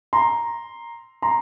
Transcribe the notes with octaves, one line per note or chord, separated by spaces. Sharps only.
A#5 C6
A#5 C6